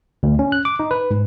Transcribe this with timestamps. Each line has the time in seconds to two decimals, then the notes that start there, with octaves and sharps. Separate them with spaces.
0.23 D2
0.39 C#4
0.52 F#6
0.65 D6
0.79 D#4
0.91 B4
1.11 G#2